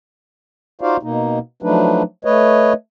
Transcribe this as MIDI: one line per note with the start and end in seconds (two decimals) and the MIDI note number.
0.81 0.97 63
0.81 0.97 65
0.81 0.97 66
0.81 0.97 72
0.81 0.97 74
0.81 0.97 77
1.03 1.39 47
1.03 1.39 58
1.03 1.39 63
1.62 2.03 53
1.62 2.03 54
1.62 2.03 57
1.62 2.03 62
1.62 2.03 63
1.62 2.03 71
2.25 2.73 57
2.25 2.73 71
2.25 2.73 73
2.25 2.73 75